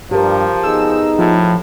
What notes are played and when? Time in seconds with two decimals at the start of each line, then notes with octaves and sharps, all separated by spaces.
0.11 G2 F3 G4 A#4
0.63 B3 D#4 G#4 E6
1.19 A2 F3